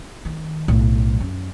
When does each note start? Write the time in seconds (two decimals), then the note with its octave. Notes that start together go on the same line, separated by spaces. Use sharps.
0.25 D#3
0.68 B1 A2
1.20 F#2